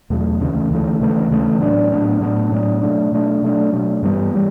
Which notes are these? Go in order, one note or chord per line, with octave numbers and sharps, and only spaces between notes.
E2 B2 F#3 A3
D2 C#3 E3 A3
D2 C#3 E3 A3
D2 C#3 E3 A3
D2 C#3 E3 A3
A2 F#3 B3 D4
A2 F#3 B3 D4
A2 F#3 B3 D4
A2 F#3 B3 D4
B2 F#3 A3 D4
B2 F#3 A3 D4
B2 F#3 A3 D4
B2 F#3 A3 D4
G2 E3 G3 B3
E3 G3